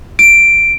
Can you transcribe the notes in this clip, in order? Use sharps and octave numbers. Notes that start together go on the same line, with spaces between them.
D7